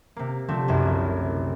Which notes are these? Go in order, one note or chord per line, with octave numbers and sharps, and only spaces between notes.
C3 A#3
D3 F3 A3 C4 G4
F#1 C2 F#2
A3